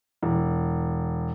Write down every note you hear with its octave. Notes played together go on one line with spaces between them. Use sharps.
E1